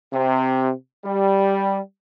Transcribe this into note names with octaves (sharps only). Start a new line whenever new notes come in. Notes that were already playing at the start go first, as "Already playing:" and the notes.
C3
G3